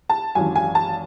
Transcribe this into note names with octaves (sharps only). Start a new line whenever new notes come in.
A5
G#1 F#2 E3 G#5
G#5
A5